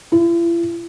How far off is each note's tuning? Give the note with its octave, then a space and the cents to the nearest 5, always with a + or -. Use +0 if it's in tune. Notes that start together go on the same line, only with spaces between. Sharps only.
E4 +45